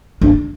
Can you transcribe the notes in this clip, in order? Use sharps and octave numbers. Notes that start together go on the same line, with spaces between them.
D4